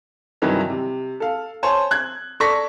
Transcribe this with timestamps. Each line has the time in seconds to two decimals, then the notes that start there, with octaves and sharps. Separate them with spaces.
0.42 G2 C3 D#3 E3 F#3
0.70 C3
1.20 A4 F5
1.63 C5 C#5 G#5 A5
1.91 F#6 G#6
2.40 A4 D5 C#6 A#6 B6